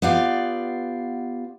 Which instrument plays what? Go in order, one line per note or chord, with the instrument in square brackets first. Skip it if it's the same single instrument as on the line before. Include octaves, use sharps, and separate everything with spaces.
[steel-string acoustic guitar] B3 F4 G4 D5 F5